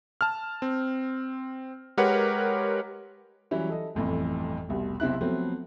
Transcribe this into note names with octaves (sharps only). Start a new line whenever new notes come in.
A5 F6
C4
G#3 G4 A#4 B4 C#5 F#5
E3 F#3 G3 C#4 E4
A4 D#5
G1 F2 A2 E3
F1 C2 B2
B1 C3 C4 E4 F#6
F3 F#3 A3 B3 C4